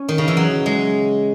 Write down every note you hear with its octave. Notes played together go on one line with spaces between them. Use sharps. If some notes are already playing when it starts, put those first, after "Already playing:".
Already playing: C#4
D#3
C#3
E3
F#3
G#3